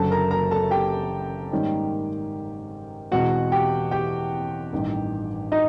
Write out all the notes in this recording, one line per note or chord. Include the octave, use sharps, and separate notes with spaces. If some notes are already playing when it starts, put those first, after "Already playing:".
Already playing: F#1 F#2 D3 F#3 A4 A5
A#4 A#5
A#4 A#5
A4 A5
G4 G5
G#2 D#3 G3 A#3 C#4
E2 B2 G#3 C4 F#4 F#5
G4 G5
G4 G5
A1 G2 D#3
D#4 D#5